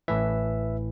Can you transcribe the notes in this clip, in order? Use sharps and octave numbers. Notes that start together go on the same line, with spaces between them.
A1 A2 E3 B4 E5